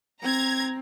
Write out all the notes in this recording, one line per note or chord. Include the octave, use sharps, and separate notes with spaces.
C4 A#5 G#6